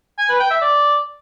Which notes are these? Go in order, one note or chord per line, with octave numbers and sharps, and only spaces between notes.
G#5
B4
G5
E5
D5